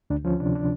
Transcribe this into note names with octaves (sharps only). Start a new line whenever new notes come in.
D2 D4
F3 C#4
C3 D4
D4